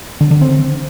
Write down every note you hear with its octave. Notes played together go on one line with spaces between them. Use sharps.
D3
D3
C4